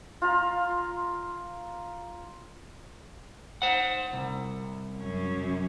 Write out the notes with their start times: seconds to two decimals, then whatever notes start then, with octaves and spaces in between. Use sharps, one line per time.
0.22 F4 A#5
3.62 C5 F#5
4.13 C2
4.98 F#2 C#4